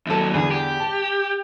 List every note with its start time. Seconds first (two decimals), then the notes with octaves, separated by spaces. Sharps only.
0.07 D#2 F#3 E4 A4
0.34 E2 D3 E3 G#4
0.51 G4
0.80 A5